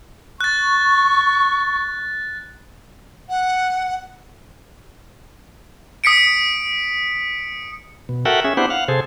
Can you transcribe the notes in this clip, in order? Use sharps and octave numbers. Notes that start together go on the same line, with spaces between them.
C#6 F#6 A6
F#5
D#6 B6 C#7 D7
B2
F#4 A4 A#4 E5 F#5 G5
C#4 G#4 E5
B3 D4 E4 G4 C5 F#5
F5 F#5
C3 G#4 A4 C5